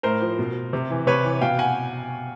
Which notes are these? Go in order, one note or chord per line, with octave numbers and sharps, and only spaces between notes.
A2 A#4 C5
F3
B2
C3
E3
C3 B4 C#5
E3
B2 F5 G5
F#5 G#5